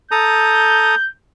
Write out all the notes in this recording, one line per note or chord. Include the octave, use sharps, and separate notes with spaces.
A4 A#5 D#6 G6